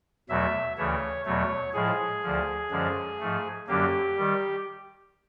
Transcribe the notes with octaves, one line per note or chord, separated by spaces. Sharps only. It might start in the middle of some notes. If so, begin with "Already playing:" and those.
E2 B2 F#3 A3 E5
D2 C#3 E3 A3 C#5
E2 B2 F#3 A3 C#5
A2 F3 G#3 G#4
D2 D3 F3
F#2 D3 F3 G#3
G#2 F3 A3
F#2 D3 F#3 A#3 G4
D#3 G3